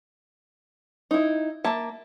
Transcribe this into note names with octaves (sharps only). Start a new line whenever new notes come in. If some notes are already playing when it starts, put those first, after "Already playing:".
D#4 E4
A#3 E5 A5